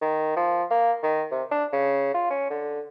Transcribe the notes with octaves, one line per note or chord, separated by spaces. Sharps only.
D#3
F3
A#3
D#3
C3
D4
C#3
F4
C#4
D3